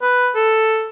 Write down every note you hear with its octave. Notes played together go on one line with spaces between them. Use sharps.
B4
A4